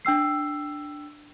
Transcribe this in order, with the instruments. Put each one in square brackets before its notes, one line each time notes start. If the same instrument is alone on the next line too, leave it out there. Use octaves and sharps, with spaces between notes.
[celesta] D4 G5 E6 C7